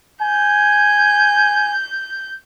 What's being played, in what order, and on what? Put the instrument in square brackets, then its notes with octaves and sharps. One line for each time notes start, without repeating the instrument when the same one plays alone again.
[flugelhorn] G#5 [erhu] G6